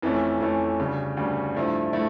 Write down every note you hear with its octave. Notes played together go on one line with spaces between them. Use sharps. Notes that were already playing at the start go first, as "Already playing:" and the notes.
F2 E3 A3 C#4
F2 E3 A3 C#4
D2 C#3 G3
D2 C#3 G3
G2 F3 A3 E4
F3 A3 E4